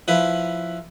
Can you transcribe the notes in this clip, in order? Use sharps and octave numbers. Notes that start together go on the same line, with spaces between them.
F3 E4 B4